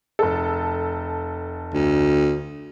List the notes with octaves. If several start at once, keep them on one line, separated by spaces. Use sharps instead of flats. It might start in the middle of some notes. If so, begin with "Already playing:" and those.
F1 A4
D2